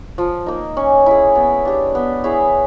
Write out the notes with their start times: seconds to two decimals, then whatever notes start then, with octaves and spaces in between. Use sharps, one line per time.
0.18 F3
0.46 A#3 D#4
0.77 C#4
1.06 E4 G#4
1.35 B3
1.65 D4 G4
1.95 B3
2.24 E4 G#4 C#5